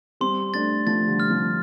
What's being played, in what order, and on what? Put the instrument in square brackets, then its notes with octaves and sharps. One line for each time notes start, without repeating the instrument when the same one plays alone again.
[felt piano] G3 C4 [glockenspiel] C6
[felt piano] A3 D4 [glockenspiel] A6
[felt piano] F3 A3 [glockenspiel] A6
[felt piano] D3 G3
[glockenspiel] F6
[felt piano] C3 F3